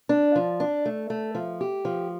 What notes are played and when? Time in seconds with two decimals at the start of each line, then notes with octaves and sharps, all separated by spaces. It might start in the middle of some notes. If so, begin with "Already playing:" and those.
0.09 D4
0.35 F3
0.60 D4
0.86 A3
1.10 A3
1.35 F3
1.61 G4
1.85 F3